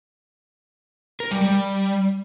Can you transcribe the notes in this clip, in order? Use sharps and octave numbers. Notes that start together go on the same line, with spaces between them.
A#4
G3
G3